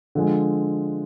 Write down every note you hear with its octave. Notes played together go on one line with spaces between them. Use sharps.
D3 F3 G#3